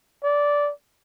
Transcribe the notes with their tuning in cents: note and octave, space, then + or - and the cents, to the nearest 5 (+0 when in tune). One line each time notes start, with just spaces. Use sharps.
D5 -10